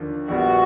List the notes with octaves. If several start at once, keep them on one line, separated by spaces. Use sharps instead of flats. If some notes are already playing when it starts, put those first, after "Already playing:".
Already playing: D#2 D3 F3 A#3
A#1 A#2 G3 B3 F#4